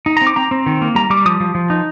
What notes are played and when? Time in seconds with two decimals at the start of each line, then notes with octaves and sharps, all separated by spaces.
0.06 D#4
0.17 C4 A#5
0.27 D6
0.36 C4 A#5
0.51 C4
0.66 D#3
0.81 A#3
0.95 G3 A#5
1.10 G3 D6
1.26 F3 D#6
1.40 F3
1.55 F3
1.70 D#4